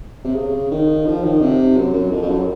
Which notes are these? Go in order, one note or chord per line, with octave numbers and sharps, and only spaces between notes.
C3
C#3
D#3
F3
D#3
C3
F#2
F#2
F2
F2
F#2